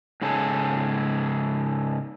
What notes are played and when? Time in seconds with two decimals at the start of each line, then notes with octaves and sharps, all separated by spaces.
0.22 G#2 C#3 G#4 A4